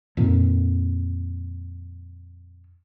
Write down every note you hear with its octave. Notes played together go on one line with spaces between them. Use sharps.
F2 A#2 D#3